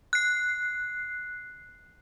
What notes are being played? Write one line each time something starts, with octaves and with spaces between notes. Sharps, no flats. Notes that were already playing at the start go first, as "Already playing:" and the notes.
F#6 C7